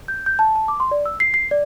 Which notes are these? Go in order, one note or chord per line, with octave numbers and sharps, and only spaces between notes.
G6
G6
A5
A5
D6
C6
D5
E6
C7
C7
D5